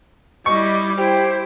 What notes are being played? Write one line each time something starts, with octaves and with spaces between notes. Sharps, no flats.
G3 E4 D#5 C#6
E4 G4 C5